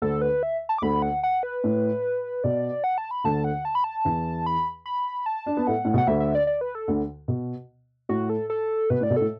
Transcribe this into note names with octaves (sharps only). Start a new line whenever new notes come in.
D2 D3 A4
B4
E5
A5
D6
D2 D3 B5
F#5
F#5
B4
A2
B2 D5
F#5
A5
B5
D2 D3 A5
F#5
A5
B5
A5
E2 E3
B5
B5
A5
D4
B3
A2 A3 F#5
A2
B2
F#5
D2 D3 E5
E5
D5
D5
B4
A4
D2 D3
B2
A2 F#4
A4
A4
B2 B4
A2
D5
B2
A2 A4